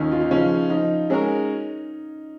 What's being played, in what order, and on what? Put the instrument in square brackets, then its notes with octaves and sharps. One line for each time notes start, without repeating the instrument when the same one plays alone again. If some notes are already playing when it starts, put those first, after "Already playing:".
Already playing: [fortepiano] D#2 [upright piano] C#4 D#4 F4
[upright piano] F4
D#4
[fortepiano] C#3 F3 [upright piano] C#4
[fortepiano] F3 [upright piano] D#4
[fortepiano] G#3 C#4 F#4 A#4